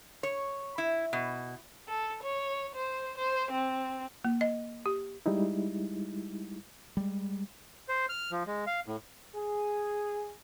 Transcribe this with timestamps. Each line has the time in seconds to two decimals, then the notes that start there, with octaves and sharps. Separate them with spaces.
0.23 C#5
0.78 E4
1.13 B2
1.88 A4
2.23 C#5
2.75 C5
3.18 C5
3.52 C4
4.25 A#3
4.41 D#5
4.86 G4
5.26 G3 G#3 D#4 E4
6.97 G3 G#3
7.89 C5
8.09 F6
8.31 F3
8.47 G#3
8.67 F5
8.87 A2
9.34 G#4